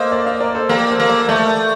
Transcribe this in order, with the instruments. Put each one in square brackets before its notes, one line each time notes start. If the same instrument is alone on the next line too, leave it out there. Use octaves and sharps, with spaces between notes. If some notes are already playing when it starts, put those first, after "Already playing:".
Already playing: [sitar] A#3 [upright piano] A4 C5 D#5
[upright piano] D5 F5
D5 F5
A#4 D5
A4 C5
[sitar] A#3 [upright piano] G4 A#4
[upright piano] A4 C5
[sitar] A#3
[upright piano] D5 F5
[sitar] A3 [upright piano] D5 F5